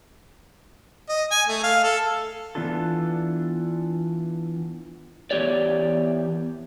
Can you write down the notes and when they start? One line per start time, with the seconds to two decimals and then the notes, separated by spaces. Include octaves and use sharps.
1.09 D#5
1.31 G#5
1.48 A3
1.63 F5
1.83 A4
2.55 E3 B3 D4 F4 A4
5.31 E2 G#3 G4 C#5 D5